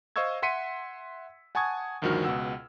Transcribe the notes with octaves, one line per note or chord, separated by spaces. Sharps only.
C5 D#5 F5 C#6 E6 G#6
E5 F#5 C6 B6 C#7 D#7
F#5 G#5 A5 C#6 D#6 G#6
D2 G2 D#3 F3 F#4 F6
C#2 B2 F#5 E6